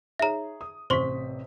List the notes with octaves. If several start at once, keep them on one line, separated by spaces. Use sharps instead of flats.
D#4 G#4 C#5 E5 A#5
D#6
A1 C3 C5 C6 C#6 B6